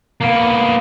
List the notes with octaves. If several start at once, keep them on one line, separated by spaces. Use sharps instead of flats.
A#3 B3